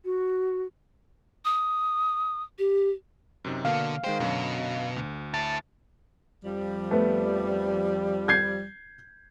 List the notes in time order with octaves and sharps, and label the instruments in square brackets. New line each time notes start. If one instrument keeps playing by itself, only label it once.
[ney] F#4
[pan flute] D#6
G4
[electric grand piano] F#2 C3 D#4
[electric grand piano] B2 A#3 [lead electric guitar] D3 [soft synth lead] F5
[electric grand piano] D#3 G#3 G5 [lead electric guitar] C5
[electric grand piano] F#2 D3 F#3 [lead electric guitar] B2
[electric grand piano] D2
[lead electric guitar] E4 A5 [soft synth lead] A6
[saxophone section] F2 F3 G3
[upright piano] A3 B3
G6 G#6 C7